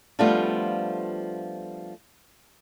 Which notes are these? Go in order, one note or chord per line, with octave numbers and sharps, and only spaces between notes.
F3 G3 A3 B3 D4 F4